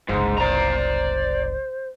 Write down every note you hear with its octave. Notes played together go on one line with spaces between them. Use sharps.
F#1 C2 G#2
C5 D5 A#5